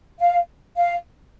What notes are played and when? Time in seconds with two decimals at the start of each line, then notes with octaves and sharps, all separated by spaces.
0.19 F5
0.77 F5